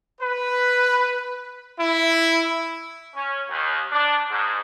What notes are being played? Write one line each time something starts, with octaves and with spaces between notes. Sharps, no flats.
B4
E4
C#4
D#2
D4
G#2